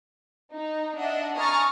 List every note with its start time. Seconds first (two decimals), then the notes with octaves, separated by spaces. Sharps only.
0.52 D#4
0.98 D4 D#5 E5 F#5
1.37 G#5 A#5 C#6 D#6 F6 A6